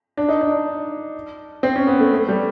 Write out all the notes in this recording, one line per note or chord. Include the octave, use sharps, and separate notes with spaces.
D4
D#4
D4
C4
C#4
B3
A3
A3
G3